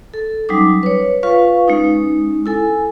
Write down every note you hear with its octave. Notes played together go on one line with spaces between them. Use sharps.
A4
F#3 G3 C#4 D#4 D6
B4 C#5
F4 B4 F5 C#6
G#3 C#4 D#4
E4 A4 G#5